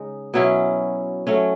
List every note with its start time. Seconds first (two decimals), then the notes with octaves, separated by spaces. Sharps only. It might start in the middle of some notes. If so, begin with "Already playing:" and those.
Already playing: C#3 G#3 D#4
0.34 B2 F#3 C#4 E4
1.27 F#3 A3 C#4